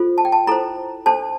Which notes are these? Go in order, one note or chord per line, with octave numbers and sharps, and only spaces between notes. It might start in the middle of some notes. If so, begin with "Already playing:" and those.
Already playing: F4 A4 C5
A5
G5
A5
E4 A4 C5 A#5
D4 A4 C5 A5